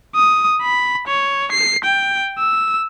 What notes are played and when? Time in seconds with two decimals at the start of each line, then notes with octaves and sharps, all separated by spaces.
0.15 D#6
0.62 B5
1.07 C#5
1.52 C7
1.84 G5
2.39 E6